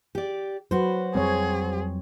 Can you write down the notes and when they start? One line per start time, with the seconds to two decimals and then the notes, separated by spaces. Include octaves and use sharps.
0.15 G4 D5
0.71 F#3 F#4 B4 C5
1.15 F2 F#3 G3 C4 G#4 C#5